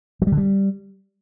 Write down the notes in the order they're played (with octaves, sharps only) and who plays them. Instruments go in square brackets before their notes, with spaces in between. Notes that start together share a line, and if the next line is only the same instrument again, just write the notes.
[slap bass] F#3
G3
D3
G3